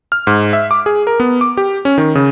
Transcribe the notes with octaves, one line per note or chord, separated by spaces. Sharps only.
F6
G#2
E5
D6
G#4
A#4
B3
D6
G4
C#4
D#3
C#3